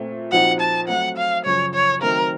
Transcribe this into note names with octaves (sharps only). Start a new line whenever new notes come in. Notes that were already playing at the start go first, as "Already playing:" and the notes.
Already playing: A#2 A3 C4
A#2 F3 C4 D#4 F#4 F#5
A5
F#3 A3 C4 F#5
F5
F#2 C#3 F3 C#5
C#5
D#3 F#3 A3 C4 A#4